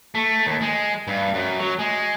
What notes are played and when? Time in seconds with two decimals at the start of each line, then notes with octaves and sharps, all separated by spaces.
0.15 A3
0.46 D#2
0.61 G#3
1.08 G2
1.34 F#2
1.59 F#3
1.79 G#3